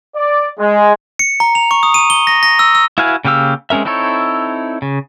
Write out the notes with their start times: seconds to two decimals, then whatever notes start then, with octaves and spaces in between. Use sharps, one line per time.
0.16 D5
0.59 G#3
1.19 C#7
1.40 A#5
1.55 F7
1.71 C#6
1.83 D#6
1.94 D#7
2.10 G7
2.27 A#6
2.43 A#6
2.59 E6
2.75 E6
2.98 E4 F#4 B4 F5 G#5
3.25 C#3 A#3 G4 F5 E6
3.70 G#3 C4 C#4 A#4 E5
3.85 C4 D#4 E4 A4 C#5
4.82 C#3